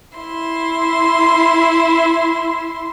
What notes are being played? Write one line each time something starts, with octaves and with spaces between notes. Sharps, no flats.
E4 C6